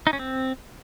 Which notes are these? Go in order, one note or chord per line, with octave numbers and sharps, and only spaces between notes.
D#4
C#4
C4